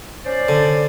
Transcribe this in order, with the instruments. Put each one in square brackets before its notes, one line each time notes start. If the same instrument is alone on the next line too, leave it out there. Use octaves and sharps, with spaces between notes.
[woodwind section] C#4 C5 D5
[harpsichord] D3